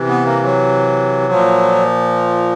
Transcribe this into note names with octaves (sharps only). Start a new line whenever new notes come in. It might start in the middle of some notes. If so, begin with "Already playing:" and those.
Already playing: C3 E3
B3
A#3
F#3
A#2 F3